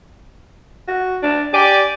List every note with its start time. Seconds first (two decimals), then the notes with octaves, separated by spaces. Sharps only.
0.88 F#4
1.23 D4
1.54 G4 D5 G#5